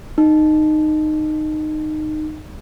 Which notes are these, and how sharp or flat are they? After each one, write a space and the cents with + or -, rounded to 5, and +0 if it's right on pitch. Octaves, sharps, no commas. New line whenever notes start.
D#4 -15